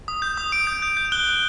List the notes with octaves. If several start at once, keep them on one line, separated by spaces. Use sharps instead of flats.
D#6
G6
D#6
D#6 D7
G6
G6
G6
F#6 G7
F#6